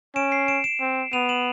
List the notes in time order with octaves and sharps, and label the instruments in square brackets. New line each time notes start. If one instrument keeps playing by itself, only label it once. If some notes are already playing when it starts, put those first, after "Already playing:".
[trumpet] C#4 [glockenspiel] D7 E7
[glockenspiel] C7 D7
D7 E7
D7 E7
[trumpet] C4
[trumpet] B3 [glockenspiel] D#7 F7
[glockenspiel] E7 F#7